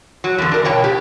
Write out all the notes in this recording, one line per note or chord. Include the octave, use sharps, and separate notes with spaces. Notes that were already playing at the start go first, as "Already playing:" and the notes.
F#3
E2 D3
D4 A#4
B2 C#5 G5
G4